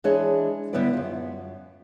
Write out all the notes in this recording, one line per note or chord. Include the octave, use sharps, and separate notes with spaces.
E3 G#3 D4 G#4 C#5 D#5
D3 G3 B3 E4 B4 D5
F#2 F4